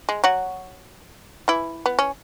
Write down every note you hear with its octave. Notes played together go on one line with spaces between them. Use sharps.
G#3
F#3 F#4
E3 E4
B3
C#4